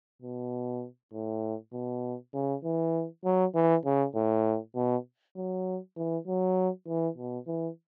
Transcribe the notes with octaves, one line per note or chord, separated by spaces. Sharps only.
B2
A2
B2
C#3
E3
F#3
E3
C#3
A2
B2
F#3
E3
F#3
E3
B2
E3